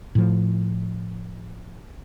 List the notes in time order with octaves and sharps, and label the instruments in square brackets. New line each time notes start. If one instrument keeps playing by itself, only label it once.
[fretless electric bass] A2 F3